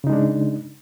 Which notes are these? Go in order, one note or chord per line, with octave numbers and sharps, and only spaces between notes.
C#3 G#3 D4 D#4